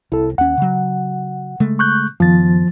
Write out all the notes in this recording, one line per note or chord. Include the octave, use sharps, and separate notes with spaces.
C2 E4 A4
D#2 C#4 F#5
C#3 F#3
C#3 G#3 A3
C#6 F#6 G6
F#2 D#3 F3 B3 A6